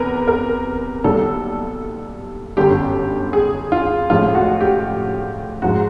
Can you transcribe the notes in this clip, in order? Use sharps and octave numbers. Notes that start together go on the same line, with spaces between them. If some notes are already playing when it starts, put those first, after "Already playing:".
Already playing: E2 C3 A#4 B4
A#4
B1 A#2 G3 A4
G1 F#2 D3 G4
G#4
F4
A1 A2 F3 G#3 F4
F#4
G4
G#2 F3 G#3 F#4